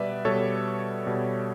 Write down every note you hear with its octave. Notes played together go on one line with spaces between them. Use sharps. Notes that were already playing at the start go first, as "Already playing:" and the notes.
Already playing: B2 G3 B4 D5 E5
B2 G3 A4 C#5
B2 G3